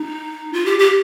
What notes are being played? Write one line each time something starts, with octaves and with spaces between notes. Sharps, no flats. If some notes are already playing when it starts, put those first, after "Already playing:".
Already playing: D#4
F4
G4
G4